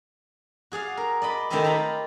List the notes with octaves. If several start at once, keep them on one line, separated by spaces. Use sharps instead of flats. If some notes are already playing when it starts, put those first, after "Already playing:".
F#4 G#4 D5 F5
A#4
D5 D#5 B5
D#3 A3 C4 E4 G4 D#5
F4 G4 A#5 B5